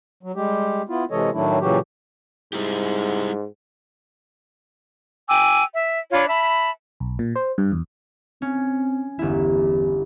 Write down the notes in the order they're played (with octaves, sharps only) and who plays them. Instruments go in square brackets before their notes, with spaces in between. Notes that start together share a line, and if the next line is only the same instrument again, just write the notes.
[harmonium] F#3
G3 G#3 G4
B3 E4 F4
C3 E3 G#3 A4 C#5 D#5
A2 D#3 F#3 A3 D4 E4
A#2 C#3 E3 F#3 F#4 G4
[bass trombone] G#2 [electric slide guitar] G3 E4 G4
[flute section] G5 G#5 D6 E6
E5
D4 F4 C#5 B5
E5 A5 B5
[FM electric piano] B1
A#2
C5
G2
E2
[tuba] C4 [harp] C#4
[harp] G1 E4 [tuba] E2